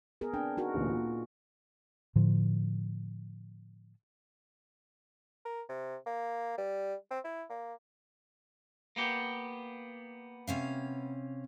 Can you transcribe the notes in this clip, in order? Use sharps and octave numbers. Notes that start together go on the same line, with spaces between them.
B3 G#4 A#4
C4 D4 G5
D#4 F#4 A#4
A1 D2 A#2
A#2
A2 D3 F3
A#4
C3
A#3
G3
C4
E4
A#3
A#3 B3 G4
C3 C#4 F5